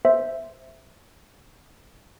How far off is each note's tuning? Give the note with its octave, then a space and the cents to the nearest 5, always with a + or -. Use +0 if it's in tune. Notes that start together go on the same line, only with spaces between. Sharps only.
C5 +0 E5 +0